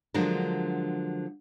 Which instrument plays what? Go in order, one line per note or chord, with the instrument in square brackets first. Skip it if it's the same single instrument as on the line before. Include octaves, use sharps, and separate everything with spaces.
[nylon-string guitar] D3 F3 F#3 G#3 D4 A#4